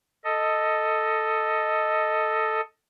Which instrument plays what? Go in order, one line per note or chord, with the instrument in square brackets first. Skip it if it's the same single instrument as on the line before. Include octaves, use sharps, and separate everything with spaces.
[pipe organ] A4 D#5